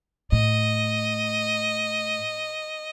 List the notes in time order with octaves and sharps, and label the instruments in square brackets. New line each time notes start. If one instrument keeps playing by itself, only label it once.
[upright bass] A2 [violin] D#5